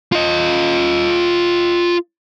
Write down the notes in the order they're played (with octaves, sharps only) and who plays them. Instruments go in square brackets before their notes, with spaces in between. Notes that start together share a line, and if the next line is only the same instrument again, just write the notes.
[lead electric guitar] F4 D#5